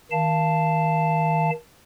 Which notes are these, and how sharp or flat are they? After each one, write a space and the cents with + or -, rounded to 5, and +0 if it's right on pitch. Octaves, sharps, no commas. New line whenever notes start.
D#3 +25 F5 -20 A5 +0